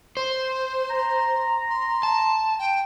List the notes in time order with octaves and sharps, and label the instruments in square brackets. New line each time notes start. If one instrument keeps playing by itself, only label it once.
[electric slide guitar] C5 [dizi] C6
[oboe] A#5
[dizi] C6
[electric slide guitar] A5
[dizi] G5